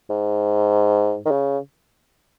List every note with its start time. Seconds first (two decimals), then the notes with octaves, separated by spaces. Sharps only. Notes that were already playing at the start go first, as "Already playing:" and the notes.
0.10 G#2
1.25 D#3
1.31 C#3